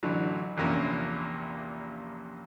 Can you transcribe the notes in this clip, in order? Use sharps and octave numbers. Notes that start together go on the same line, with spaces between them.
A1 D3 E3 F#3
A#1 E2 C3 A#3 C#4 D4